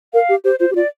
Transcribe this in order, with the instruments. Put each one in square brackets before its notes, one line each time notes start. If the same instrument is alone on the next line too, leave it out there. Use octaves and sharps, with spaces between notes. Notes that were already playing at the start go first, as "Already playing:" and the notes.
[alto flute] A#4 [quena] F5
[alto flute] G4
[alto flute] G4 [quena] C5
[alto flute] F4 [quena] C5
[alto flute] G4
[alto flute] F4 [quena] D5